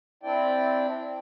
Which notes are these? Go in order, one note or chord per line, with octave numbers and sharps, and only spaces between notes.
C4 D4 E4 D5 G5